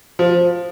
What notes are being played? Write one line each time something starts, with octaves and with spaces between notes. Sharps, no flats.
F3